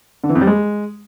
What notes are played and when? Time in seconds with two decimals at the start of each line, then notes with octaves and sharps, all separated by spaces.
0.24 D3
0.29 E3
0.35 F2
0.41 G3
0.47 G#3